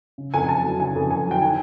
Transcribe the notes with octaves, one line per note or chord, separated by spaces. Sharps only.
C#3
F2 G#5
G#5
F2 A5
F#3
C#3 G#5
F2
F2 G#5
F#3 G5
D#3 G#5